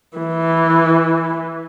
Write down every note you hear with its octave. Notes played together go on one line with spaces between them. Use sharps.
E3